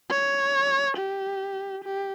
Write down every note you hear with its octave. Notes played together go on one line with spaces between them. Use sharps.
C#5
G4
G4